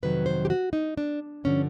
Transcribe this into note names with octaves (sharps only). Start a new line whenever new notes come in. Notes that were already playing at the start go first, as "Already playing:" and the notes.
F2 C3 D#3 F#3 B4
C5
G4
F#4
D#4
D4
G2 D3 F3 C#4